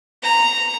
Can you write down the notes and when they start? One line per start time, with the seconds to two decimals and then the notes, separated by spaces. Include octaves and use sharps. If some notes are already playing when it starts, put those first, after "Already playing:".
0.23 A#5